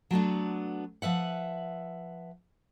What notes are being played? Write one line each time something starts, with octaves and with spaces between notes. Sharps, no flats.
F#3 A3 B3 D4
F3 B4 E5 F#5